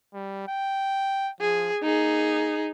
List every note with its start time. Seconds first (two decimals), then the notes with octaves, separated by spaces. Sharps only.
0.14 G3
0.48 G5
1.41 F3 G#4
1.83 A#3 D#4 G#4